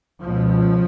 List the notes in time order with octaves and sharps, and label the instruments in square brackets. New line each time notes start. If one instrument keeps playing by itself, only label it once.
[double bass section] C#2 B2 F3